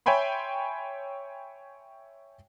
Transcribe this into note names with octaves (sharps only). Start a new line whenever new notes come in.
C#5 E5 G5 G#5 B5 C6